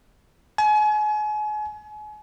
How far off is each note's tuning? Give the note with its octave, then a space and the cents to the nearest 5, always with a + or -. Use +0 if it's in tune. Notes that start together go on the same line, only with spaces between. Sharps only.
G#5 +35